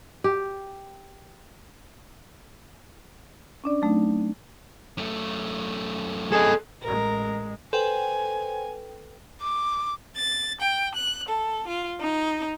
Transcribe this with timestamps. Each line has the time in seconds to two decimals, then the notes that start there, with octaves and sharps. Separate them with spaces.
0.24 G4
3.64 C#4 D4 D5
3.82 F#3 A3 C4 D4 D#4
4.98 F#2 A3
6.32 G#4 A4 D#5
6.83 A1 G#3 A#4
7.73 A4 B4 C5 G5 G#5
9.41 D6
10.17 A6
10.60 G5
10.95 F#6
11.27 A4
11.67 F4
11.99 D#4